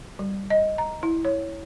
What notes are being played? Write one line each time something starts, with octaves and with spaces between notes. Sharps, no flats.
G3
D#5
A#5
E4
C#5